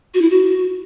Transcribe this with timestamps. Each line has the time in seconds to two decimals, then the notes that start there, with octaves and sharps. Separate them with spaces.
0.14 F#4
0.22 E4
0.30 F#4